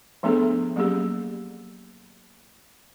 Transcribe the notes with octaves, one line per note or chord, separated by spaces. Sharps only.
F3 A3 B3 D4 G#4 A4
F#3 A#3 C#4 G4 G#4